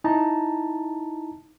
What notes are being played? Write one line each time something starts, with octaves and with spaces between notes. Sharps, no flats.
D#4 E4 A5 A#5